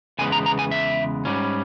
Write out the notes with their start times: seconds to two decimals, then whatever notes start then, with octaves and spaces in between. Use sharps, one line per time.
0.19 E2 C#3 G#3 B3 G#5
0.32 A#5
0.46 A#5
0.59 G#5
0.71 E5
1.25 G#2 G3 C#4